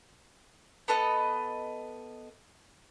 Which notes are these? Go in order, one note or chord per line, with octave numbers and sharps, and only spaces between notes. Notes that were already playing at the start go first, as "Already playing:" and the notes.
B3 A4 D#5